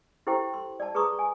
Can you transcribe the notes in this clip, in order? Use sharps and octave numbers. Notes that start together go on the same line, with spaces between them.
E4 G4 A4 C5 G5
C6
D5 A5
G#4 B4 A#5 C#6 D#6
G#5